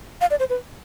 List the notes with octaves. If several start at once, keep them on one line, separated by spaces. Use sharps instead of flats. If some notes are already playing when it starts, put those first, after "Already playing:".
F5
D5
C5
B4